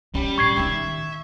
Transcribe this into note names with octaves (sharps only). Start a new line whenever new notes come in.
G3 C#4
A#1 A2 C#6 G#6 C7
D#3 D#4 E5